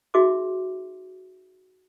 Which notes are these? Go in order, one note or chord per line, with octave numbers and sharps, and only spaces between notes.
D#4 F#4 G#4 E5 C6 D6